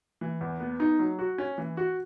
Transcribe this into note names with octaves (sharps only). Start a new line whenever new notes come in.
E3
E2
B3
D#4
F#3
F#4
C#4
E3
F#4